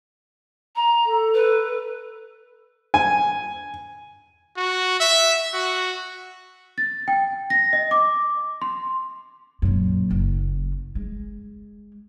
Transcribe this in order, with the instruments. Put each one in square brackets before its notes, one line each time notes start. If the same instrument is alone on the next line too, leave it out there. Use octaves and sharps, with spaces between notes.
[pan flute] A#5
[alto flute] A4
[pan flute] B4
[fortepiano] G#5
[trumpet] F#4
E5
F#4
[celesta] A6
G5
A#6
D#5
D6
C6
[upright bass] F#2 A#2
F#1
G#3